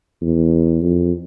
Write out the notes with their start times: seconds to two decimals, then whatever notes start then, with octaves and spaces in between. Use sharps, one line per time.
0.22 E2
0.81 F2